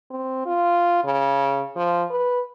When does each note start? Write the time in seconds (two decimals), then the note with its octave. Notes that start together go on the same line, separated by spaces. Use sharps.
0.10 C4
0.46 F4
1.04 C#3
1.76 F3
2.10 B4